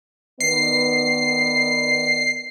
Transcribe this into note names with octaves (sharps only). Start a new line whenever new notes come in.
D#3 B3 D5 C7